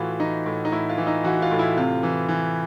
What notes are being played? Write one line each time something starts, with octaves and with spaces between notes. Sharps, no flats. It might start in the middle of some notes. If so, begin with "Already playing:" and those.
Already playing: A2 E3 F4 F#4
E3 D#4
A2
D#4
A2 E4
F4
E3
D#4
E3 F#4
F4
A2
E4
C3 F4
E3
E3